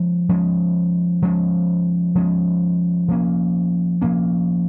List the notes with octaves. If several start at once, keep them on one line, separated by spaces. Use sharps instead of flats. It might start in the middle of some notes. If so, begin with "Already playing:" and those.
Already playing: F3 G#3 C#4
F3 G#3 C#4
F3 G#3 C#4
F3 G#3 C#4
F3 A#3 C#4
F3 A#3 C#4